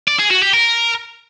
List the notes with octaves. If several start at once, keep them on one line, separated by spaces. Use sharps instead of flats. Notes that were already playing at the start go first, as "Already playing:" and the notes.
D5
G#4
F#4
G4
A#4